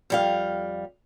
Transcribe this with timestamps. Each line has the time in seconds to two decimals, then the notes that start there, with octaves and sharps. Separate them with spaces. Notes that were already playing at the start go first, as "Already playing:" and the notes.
0.10 F2 G3 F5